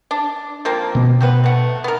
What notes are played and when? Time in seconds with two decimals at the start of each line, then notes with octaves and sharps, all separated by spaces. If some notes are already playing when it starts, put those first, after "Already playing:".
0.11 D4
0.65 F3 A#3 C4
0.95 B2 B3
1.21 C4 F#4 B4
1.44 A3 F#5
1.84 B3 A#4